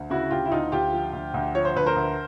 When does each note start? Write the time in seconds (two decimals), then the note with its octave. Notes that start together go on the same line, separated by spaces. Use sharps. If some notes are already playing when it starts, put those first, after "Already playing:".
Already playing: D2
0.10 C#3 E4 F#4
0.31 D2 F4 G4
0.46 E4
0.52 D2 D#4 F4
0.72 D2 F4 G4
0.93 F3
1.13 D2
1.34 D2
1.55 F3 C#5
1.65 C5
1.75 D2 B4
1.86 A#4 C5
1.96 D2